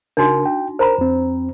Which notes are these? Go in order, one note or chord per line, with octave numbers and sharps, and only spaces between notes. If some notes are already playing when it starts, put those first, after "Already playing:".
C#3 D4 D#4 F#4 A#4
G5
A#4 C5 A#5 B5
F2 C4